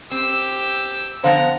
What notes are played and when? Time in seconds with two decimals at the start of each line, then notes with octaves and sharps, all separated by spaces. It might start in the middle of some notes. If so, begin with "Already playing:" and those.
0.11 C4 G4 E6
1.24 D3 F3 B3 C5 F5 A#5